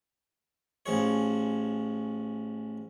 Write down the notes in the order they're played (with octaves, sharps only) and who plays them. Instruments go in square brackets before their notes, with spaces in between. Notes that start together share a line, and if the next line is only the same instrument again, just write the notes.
[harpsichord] A1 F3 G#4 C#5